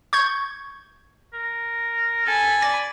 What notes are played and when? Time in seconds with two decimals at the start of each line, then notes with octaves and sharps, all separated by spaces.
0.13 C#6 G6 G#6
1.33 A#4
2.27 A4 G#5 B5
2.62 D5 A6